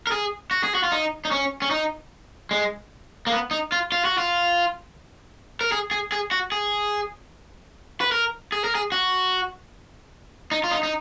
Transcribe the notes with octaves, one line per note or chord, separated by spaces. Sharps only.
A#4
G#4
F#4
G#4
F#4
F4
D#4
D#4
C#4
C#4
D#4
G#3
A#3
B3
D#4
F4
F4
F#4
F4
A#4
G#4
G#4
G#4
F#4
G#4
B4
A#4
G#4
A#4
G#4
F#4
D#4
F4
D#4
D#4